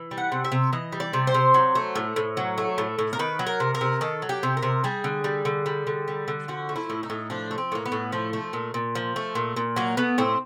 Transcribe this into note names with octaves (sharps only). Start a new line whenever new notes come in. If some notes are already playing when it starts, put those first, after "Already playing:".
Already playing: E3
G3
F#5
C3
E5
C3
E3 D#5
G3
D5
C3
C5
C3
F#3
A3
A2
A2
F#3
A3
A2
A2
A#4
D#3 B4
F#3
A#4
C3
A#4
C3
D#3 A4
F#3
G4
C3
A#4
C3
G3 G#4
D3
G3
D3
G3
D3
G3
D3
F3 F#4
A3
E4
A2
D#4
A2
F3 D4
A3
C4
A2 A#3
B3
A2
F3 A3
A3
A#2
A#2
F3
A3
A#2
A#2
F#3 A#3
A3 B3
A2 C4